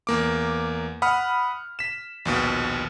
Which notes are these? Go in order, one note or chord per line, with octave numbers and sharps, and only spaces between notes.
E2 A#3 D6
F#5 B5 D#6 F6
B6 E7
A#1 D#2 B2